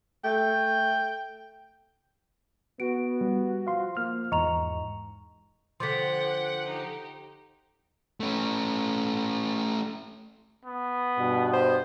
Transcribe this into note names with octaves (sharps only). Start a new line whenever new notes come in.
A3 G5
B3 F#4 D7
G3
F3 F5 C6
A#3 F6
E2 G#2 D#5 A#5 C#6 F7
D3 F3 F#5 G5 C6 D6 B6
D#4 G4
A3 C#4
B3
G2 B2
C5